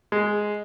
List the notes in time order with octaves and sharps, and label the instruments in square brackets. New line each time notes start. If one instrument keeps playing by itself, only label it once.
[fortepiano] G#3